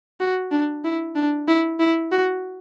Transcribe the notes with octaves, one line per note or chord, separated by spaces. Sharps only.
F#4
D4
E4
D4
E4
E4
F#4